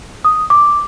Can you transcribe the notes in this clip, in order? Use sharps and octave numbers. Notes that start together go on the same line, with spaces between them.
D#6
D6